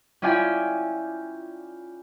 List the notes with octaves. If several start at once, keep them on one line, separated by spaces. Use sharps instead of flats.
C#4 E4 F4 D5 G5 G#5